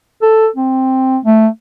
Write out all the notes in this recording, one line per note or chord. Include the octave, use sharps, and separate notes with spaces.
A4
C4
A3